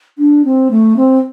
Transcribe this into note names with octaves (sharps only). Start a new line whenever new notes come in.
D4
C4
A3
C4